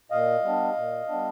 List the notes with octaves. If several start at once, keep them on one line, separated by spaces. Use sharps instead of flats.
A#2 D#5 F5
G3 B3 D4
A#2
G3 B3 D4